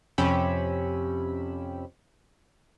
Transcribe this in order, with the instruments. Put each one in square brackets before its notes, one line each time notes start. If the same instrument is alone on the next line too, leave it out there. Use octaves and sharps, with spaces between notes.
[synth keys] F2 C3 C#4 G4 B5 E6